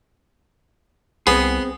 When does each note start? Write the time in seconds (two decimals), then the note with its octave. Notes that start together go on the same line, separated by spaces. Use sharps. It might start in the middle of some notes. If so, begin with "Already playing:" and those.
1.27 C2 B3 C4 G#4